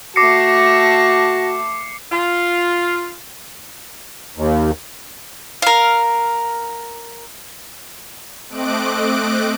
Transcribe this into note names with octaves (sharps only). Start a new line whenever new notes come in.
A3 F#4 A5 D6 A#6 C7 C#7
F4
D#2
A#4 F5
A3 C4 D#5 D6 F#6 D7